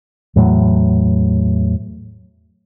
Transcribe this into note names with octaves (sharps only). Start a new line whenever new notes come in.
E2 A2 F#3